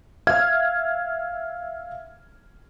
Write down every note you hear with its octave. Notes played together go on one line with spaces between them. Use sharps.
E5 F5 F6 G#6